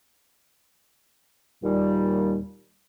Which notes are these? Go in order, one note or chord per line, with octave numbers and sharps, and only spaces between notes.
D#2 A#2 G3